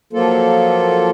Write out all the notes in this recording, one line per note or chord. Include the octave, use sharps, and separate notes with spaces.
F3 F#3 A#3 F4 A4